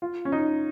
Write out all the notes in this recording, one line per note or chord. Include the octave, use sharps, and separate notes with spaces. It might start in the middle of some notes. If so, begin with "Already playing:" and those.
F4
C#4
D#4